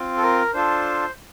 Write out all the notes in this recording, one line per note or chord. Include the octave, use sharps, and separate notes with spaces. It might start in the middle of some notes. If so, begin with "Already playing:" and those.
Already playing: C4 F4
A4
A#4
D4 F4 A4 C5